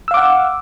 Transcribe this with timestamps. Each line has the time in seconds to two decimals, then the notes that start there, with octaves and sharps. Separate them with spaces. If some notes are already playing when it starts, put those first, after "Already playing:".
0.08 E6
0.11 F5
0.14 D6
0.17 F#5